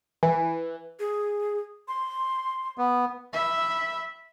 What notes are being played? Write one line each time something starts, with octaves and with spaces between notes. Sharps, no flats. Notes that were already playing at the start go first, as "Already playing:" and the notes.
E3
G#4
C6
B3
E5 B5